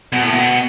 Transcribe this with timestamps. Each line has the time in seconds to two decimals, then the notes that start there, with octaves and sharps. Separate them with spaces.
0.12 B2
0.23 A2
0.32 B2